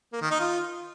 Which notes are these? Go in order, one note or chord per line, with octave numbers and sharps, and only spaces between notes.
A#3
D#3
D#4
F4